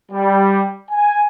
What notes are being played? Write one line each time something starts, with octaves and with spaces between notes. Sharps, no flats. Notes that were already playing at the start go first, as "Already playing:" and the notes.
G3
G#5